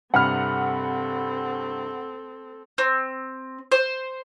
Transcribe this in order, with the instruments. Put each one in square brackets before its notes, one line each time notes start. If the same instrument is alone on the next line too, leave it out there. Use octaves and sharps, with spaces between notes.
[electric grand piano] G2 C3 [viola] C4 A4 [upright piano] F#5 B5 F6
[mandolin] C4
C5